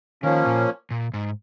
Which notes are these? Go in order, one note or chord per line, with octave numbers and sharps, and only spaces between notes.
D#3 F3 A#3 C#4
A#2
A#2
G#2